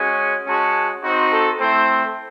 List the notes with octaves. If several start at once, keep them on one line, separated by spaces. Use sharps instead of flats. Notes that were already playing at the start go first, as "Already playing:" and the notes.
Already playing: G#3 C#4 F#4
G#3 C#4 F#4 A5
C4 D#4 F#4 C5
A4
A3 C4 E4 C5